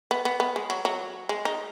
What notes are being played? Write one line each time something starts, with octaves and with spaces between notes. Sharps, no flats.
B3
B3
B3
G#3
F#3
F#3
G#3
D#4